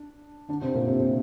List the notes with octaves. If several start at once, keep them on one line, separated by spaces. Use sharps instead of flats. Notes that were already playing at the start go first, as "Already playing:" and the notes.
Already playing: D4
D3 D4
C3 C4
A#2 A#3
C3 C4
C3 C4